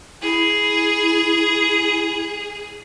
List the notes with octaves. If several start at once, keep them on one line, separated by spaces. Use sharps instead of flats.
E4 G#4